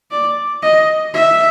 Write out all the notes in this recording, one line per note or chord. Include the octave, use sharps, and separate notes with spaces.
D5
D#5
E5